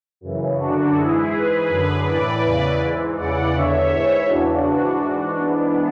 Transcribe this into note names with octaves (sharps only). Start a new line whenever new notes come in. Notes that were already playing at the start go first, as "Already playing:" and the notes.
F#2 C#3 E3
F#2 D3 D4 F#4
G#2 E3 E4 G#4
G#2 E3 G#4 B4
F#2 D3
A2 E3 B4 D5
E2 C#3 E3
G#2 E3
E2 C#3 E3 D5 F#5
E2 D3 C#5 E5
G#2 E3
E2 C#3 E3 D4 F#4
G#2 E3
G#2 E3
G#2 E3 B3 D4